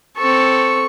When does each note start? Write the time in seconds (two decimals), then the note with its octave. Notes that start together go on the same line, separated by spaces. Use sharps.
0.18 C4 A4 C#6